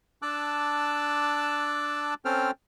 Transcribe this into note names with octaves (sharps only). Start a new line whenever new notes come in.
D4 A5 D6 E6 F#6
C4 C#4 A4 C5 G5 F6